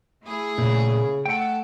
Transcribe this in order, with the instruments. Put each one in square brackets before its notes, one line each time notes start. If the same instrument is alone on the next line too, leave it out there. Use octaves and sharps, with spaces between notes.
[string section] A3 E4 G#4
[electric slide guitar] A#2 [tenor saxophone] C#3
[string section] A3 A4 [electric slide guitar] F#5 G5